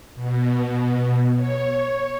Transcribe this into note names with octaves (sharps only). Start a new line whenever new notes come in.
B2
C#5